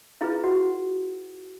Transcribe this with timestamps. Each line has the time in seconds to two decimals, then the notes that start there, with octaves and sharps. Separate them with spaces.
0.21 E4 F4 G#4 B4 F5
0.44 F#4 F#5